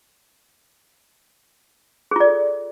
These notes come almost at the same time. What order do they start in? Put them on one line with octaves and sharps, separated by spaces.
G#4 F4 D5 A4